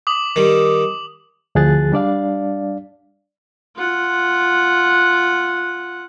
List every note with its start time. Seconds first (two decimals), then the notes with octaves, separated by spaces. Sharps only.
0.07 D6 D#6 F#7
0.36 D#3 G3
1.55 D2 D3 F3 G#4 F#6 A6
1.92 G3 D4 D5 F5
3.76 F4 F#5